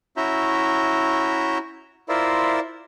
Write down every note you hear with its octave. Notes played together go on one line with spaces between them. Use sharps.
C#4 E4 F#4 E5 A#5 G6
E4 F4 A#4 C5 D5 E5